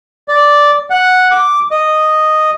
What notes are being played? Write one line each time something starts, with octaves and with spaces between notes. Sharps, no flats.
D5
F#5
D6
D#5